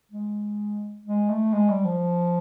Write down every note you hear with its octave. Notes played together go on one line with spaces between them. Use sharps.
G#3
G#3
A3
G#3
G3
F3